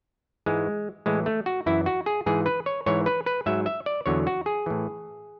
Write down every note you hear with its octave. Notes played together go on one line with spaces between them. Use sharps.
G#2 E3 G#3
A2 E3 G#3
A3
F#4
F#2 E3 E4
F#4
G#4
G#2 E3 G#4
B4
C#5
G#2 E3 C#5
B4
B4
G#2 F#3 E5
E5
D5
E2 D3 F#3 C#5
F#4
G#4
A2 E3